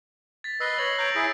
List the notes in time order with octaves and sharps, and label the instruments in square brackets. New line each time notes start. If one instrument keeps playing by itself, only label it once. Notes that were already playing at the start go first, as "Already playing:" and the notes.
[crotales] A6 B6
[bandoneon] B4 D#5 [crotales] E6 C7 G7
[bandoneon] C#5 [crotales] A#6 F#7
[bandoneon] C#5 A#5 [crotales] G6 D7
[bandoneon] E4 G#4 [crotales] B6